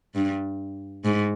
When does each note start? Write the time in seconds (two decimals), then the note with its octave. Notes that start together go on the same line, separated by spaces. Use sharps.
0.15 G2
1.05 G#2